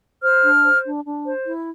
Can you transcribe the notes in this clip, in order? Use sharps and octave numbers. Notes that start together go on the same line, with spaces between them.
C5 F6
D4
C5
D4
D4
C5
E4